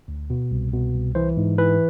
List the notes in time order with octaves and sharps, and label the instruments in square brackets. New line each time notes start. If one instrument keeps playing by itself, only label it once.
[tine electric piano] D2
B2
C2
B2
C2
E3 C5
G#2
E3 B4